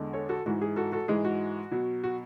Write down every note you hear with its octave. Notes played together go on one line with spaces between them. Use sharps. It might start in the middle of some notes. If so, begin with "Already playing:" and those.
Already playing: E2 D3 G#3
A4 C#5
F#4 A4
G#2 E3 G#3 F#4
G#4
F#4 A4
F#4 A4
G#2 E3 G#3 G#4
F#4
B2 F#3
F#4